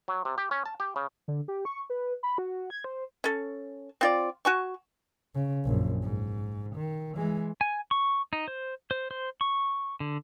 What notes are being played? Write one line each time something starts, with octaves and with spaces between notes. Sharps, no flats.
F#3
C3
G4
C#4
A5
G4
C#3
D3
G4
C#6
B4
B5
F#4
G#6
C5
C#4 A4
C4 F4 D5
F#4 G#5 C#6
C#3
A#1 F#2
G#2
D#3
E3 G#3
G#5
C#6
D#4
C5
C5
C5
C#6
D3